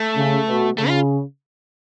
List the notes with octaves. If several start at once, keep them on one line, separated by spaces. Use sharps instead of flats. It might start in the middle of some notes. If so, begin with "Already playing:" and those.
Already playing: A3
C#3
B2
C#3 A3
F4